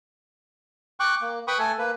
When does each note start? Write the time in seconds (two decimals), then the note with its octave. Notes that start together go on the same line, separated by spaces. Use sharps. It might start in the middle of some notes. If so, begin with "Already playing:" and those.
1.00 G5 C#6 D6 F#6
1.21 A#3
1.48 B4 G5 B5 C#6 D#6
1.59 A3 A4 G#5
1.78 A#3 B4